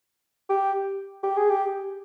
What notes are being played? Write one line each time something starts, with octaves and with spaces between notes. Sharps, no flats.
G4
G4
G#4
G4